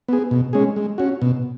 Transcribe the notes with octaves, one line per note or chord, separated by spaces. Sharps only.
B3 G#4
B2
G#3 C#4 G#4
G#3
C#4 F#4
B2